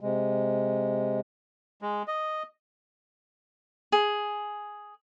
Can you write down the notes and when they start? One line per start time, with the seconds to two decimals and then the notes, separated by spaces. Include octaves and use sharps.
0.01 C3 G#3
1.82 G#3
2.08 D#5
3.92 G#4